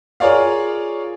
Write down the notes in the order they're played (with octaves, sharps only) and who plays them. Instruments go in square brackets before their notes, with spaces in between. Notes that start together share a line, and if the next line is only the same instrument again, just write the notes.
[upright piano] F4 G#4 A#4 C#5 D5 F5